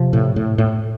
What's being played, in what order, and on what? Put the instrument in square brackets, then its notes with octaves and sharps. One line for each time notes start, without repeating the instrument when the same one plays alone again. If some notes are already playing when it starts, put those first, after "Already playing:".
Already playing: [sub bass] C3 [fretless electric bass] F3
[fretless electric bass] A2
A2
A2